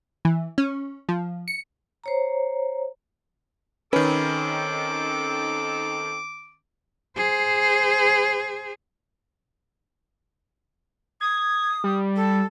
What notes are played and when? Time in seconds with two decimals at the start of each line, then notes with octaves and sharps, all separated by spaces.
0.25 E3
0.58 C#4
1.09 F3
1.48 C#7
2.04 C5 C#5 A#5
3.93 D#3 C4 C#4 D#4 A4 B4 D6
7.16 G#4 C5
11.21 D#6 G#6
11.84 G3
12.16 A4